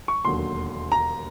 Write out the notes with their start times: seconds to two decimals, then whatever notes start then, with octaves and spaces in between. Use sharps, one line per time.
0.08 C#6
0.25 E1 D#2 D3 F#3 C6
0.92 A#5